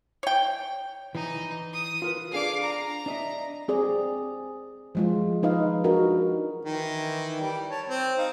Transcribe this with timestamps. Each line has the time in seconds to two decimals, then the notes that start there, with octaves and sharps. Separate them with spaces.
0.23 C#5 G5
1.15 E3 D#4
1.73 D#6
2.02 F4 A#4 B4
2.31 D4 G#4 A4 F5 D6
2.63 A#5
3.06 D4 D#5 E5
3.68 C4 G#4 D5
4.95 F3 G#3 F4
5.43 F3 D#4 B4 D#5 F5
5.84 D4 D#4 F#4 A#4
6.65 D#3 E3
7.40 G3
7.71 C#5 A5
7.88 C4
8.18 D#4 F5